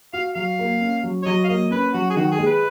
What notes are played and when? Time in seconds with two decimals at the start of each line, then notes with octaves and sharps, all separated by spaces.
0.13 F#4 F5
0.35 F#3 F5
0.59 A#3
0.81 C#4
1.04 F#3
1.23 C#5
1.26 F#3 D#5
1.44 F5
1.48 A#3 D#5
1.71 C#4 B4
1.93 F#3 F#4
2.10 G#4
2.16 D#3 F#4
2.32 G#4
2.39 G#3
2.46 B4